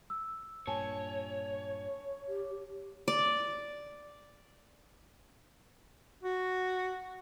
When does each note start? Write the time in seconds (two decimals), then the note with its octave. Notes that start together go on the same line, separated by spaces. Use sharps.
0.10 E6
0.67 G2 A#2 C#5 G#5 A5
2.28 G4
3.08 D5
6.23 F#4